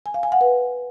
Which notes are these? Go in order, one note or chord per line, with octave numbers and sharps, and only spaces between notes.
G#5
F5
G#5
F#5
B4